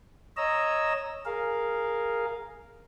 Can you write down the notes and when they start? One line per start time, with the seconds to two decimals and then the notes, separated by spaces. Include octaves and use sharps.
0.37 C#5 D#5 A#5 E6
1.25 G#4 A#4 F5